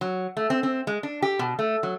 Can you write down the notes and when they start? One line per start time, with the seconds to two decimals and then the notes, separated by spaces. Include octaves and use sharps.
0.01 F#3
0.37 A3
0.50 C4
0.63 C4
0.87 G#3
1.03 D4
1.22 G4
1.39 B2
1.59 A3
1.83 F#3